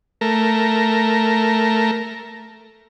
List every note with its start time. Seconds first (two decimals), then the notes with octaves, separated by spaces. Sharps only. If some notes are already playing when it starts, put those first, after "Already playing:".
0.21 A3 A#4